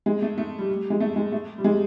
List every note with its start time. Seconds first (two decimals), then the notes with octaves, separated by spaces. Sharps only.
0.06 G#3
0.22 A3
0.38 A3
0.58 G3
0.69 G3
0.90 G#3
1.00 A3
1.16 G#3
1.32 A3
1.58 G3
1.64 G#3